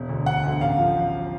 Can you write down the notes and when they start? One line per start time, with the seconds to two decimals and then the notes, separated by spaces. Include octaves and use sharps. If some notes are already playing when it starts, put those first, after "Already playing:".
Already playing: E1
0.09 D2 D3
0.26 E1 F#5
0.43 D2 D3
0.60 A1 F5
0.78 F3